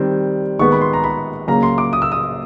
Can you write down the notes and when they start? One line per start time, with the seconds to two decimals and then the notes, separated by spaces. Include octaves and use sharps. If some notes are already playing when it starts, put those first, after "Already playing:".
Already playing: D#3 G3 C4
0.59 D#3 G#3 B3 C#6
0.72 B5
0.81 C6
0.93 A#5
1.04 B5
1.48 C#3 F#3 A#3 A#5
1.63 C6
1.78 D6
1.93 D#6
2.02 E6
2.12 D#6